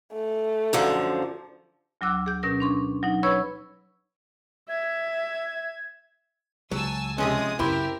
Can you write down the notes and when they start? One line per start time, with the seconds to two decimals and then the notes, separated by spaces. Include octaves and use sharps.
0.12 A3
0.73 F#2 D3 F3
2.01 D2 F#3 D6 E6 F#6
2.26 G#4 G6
2.43 B2 C#4 A#4 A#6
2.60 D4 C6 C#6
3.03 F#3 D#4
3.23 B4 C#5 B5 C#6 E6 G#6
4.69 E5 G#6
6.71 C#2 F#3 G#5 A5 E6
7.18 C3 F3 G#3 C#4 D#6
7.59 F#2 C#3 C4 E4 G4 A#4 E5 C6